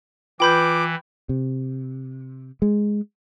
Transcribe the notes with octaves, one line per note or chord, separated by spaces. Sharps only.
E3 F4 B4 G5 B5 D6 G6
C3
G#3